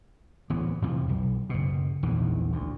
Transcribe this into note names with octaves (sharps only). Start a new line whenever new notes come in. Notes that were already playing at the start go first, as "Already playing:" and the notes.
D1 E3 B3
F2 C3 E3 F3
B1
F#1 B2
A#1 E2 D#3 E3
D2